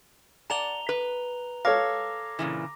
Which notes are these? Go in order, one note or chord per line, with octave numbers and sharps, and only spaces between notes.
D5 F#5 A5 A#5 F7 G7
B4
A4 C#5 F5 D6 A#6
A#2 C#3 E3